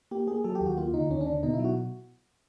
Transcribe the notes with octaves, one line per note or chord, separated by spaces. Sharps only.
A#3 G4
A#3 G#4
F#3 A4
G4
D#2
F#4
A#3 F4
D3 D#4
D#2 C#4
D4
D3
B2 D#4
E4
F#3
F#4